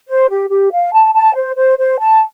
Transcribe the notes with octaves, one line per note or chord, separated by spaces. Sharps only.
C5
G4
G4
F5
A5
A5
C5
C5
C5
A5